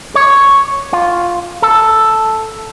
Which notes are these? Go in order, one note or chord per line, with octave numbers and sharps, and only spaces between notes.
C#5
F4
A4